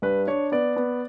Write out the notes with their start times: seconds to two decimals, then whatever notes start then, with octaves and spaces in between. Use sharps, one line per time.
0.02 G2 B4
0.27 D4 C#5
0.52 B3 D5
0.76 B3